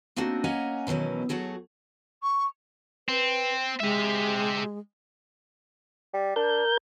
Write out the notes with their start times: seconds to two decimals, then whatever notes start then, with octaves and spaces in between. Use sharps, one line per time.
0.16 A#3 C4 D4 D#4 F#4
0.44 A#3 C#4 D#5 F#5 G#5 A#5
0.87 B2 D#3 E3 F#3 C#4
1.29 F#3 A3 F#4 G#4
2.22 C#6
3.09 C4 B4
3.80 G#3 G4 E5
6.14 G3
6.36 D4 A#4 G6